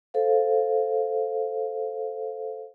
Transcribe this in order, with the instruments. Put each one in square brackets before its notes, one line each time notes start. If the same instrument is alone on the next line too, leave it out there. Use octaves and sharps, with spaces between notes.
[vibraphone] A4 C5 F5